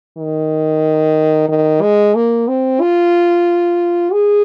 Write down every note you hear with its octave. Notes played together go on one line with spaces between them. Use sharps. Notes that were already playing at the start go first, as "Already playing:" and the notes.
D#3
D#3
G#3
A#3
C4
F4
G#4